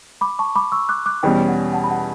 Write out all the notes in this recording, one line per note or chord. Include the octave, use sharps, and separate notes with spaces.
B5 D6
A5 C#6
B5 D6
C#6 E6
D6 F#6
D6 F#6
E2 B2 G3 C#4 G5
F#5
F#5 A5
B5
F#5 A5